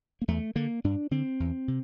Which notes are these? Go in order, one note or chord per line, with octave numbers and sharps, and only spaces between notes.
A#3
E2 A3
D3 A#3
G2 D4
D3 C4
E2
C3